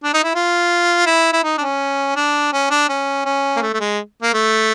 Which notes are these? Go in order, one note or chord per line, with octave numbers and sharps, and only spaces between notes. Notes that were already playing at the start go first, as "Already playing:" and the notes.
D4
D#4
E4
F4
E4
E4
D#4
D4
C#4
D4
C#4
D4
C#4
C#4
A#3
A3
A3
G#3
A#3
A3